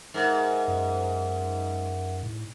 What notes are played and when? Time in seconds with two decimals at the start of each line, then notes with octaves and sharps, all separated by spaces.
0.14 G#2 A#4 E5 F#5
0.68 F#2
2.23 A2